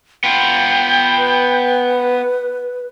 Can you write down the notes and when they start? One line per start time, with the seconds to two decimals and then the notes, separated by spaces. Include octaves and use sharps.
0.24 B3 F4 G5
1.17 B4